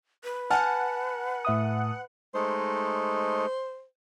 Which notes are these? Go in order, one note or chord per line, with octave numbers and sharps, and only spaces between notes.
B4
F#5 G#5 A5 F6
A2 E5 D#6
G#3 A3 D#4 C5